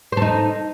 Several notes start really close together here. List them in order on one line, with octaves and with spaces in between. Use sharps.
C5 A4 D#4